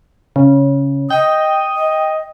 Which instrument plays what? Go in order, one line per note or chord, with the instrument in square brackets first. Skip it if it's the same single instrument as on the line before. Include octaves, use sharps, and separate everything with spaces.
[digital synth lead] C#3
[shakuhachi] D#5 [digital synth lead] G5 [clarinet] D#6
[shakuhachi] D#5